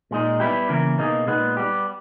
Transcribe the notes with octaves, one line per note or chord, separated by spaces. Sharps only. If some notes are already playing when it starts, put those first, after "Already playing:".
A#2 G#3 D#4
G3 B3 E4 G4
C#3 E3 A#3
B2 A#3 D#4 G#4
A#2 G#3 B3 D#4
G3 B3 G4